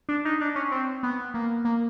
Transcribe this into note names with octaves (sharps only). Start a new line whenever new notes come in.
D4
D#4
D4
C#4
C4
B3
A#3
A#3